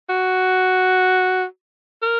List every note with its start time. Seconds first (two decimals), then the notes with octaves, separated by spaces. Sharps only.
0.09 F#4
2.03 A#4